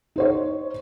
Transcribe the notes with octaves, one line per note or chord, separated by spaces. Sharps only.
D#4 C5 C#5